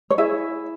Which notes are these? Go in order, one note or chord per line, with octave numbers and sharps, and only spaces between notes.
C#5
E4 G#4 E5